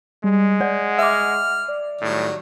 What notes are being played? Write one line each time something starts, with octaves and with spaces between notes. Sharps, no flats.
G3 G#3
D5 F#5
E5 D6 F6
D5
A2 D#3 F#3 G3